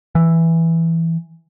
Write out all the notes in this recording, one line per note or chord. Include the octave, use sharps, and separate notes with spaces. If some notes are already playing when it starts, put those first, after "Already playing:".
E3